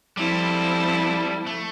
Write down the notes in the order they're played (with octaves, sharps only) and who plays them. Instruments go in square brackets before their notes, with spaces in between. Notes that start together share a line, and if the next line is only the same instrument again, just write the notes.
[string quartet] F3 C4 E4 A4 [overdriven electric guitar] G3
[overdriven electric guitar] A3